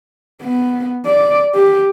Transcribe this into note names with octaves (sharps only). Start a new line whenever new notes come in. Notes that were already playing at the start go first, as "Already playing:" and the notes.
B3
D5
G4